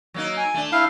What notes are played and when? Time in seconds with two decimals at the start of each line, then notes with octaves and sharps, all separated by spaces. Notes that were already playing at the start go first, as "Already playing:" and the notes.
0.14 F#3 A#3 D#4
0.37 G#5
0.54 A3 D4
0.72 E4 F5